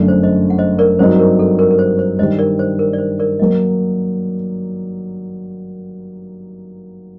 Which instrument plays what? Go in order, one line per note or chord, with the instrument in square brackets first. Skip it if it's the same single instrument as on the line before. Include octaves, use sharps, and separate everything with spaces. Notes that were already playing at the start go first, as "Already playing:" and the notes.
Already playing: [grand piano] G1 F#2 F#3 A3 D4
[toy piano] C5
C5 D#5
F#5
C5 D#5
A#4 D5
[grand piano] G2 F#3 C4 D#4 F#4 [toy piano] C5
[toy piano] A#4
A4
A#4
A#4
C5
C5
[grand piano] G2 D#3 G3 [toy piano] C5 D#5
[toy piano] A#4 D5
C5
A#4
D5
C5
A#4 D5
[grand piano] F#3 A#3 [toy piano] D#5